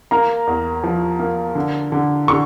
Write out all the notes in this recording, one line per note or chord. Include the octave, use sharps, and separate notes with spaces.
A#3 A#5
E2
F3
A#3
D3
D3
D3 C#6